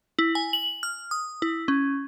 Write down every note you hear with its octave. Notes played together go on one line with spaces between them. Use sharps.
E4
G#5
F#7
F6
D#6
E4
C#4